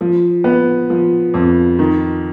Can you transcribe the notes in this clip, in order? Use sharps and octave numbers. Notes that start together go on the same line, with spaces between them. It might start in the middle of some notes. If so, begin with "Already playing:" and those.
F3
B3
F3
F2
D#3